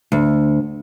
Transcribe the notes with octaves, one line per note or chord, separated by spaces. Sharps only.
D2